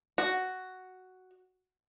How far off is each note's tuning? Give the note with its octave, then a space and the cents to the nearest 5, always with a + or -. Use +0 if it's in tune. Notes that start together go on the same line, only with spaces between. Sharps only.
F#4 +5